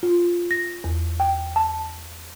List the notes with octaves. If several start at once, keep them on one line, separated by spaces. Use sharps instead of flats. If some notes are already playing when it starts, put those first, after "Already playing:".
F4
A#6
E2
G5
A5